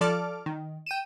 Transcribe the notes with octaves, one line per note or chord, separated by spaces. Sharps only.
F3 A4 D5 A5 D6 F6
D#3
G5 D#7 E7